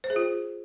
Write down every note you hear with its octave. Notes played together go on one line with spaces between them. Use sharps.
C5
G#4
F4